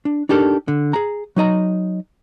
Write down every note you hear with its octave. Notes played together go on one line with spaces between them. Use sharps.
D4
D4 D#4 G4 A4 A#4
D3
G#4 A#5
F#3 D#4 D#5 A#5